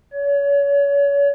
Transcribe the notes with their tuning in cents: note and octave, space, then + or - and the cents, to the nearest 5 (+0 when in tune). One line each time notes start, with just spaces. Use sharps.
C#5 +35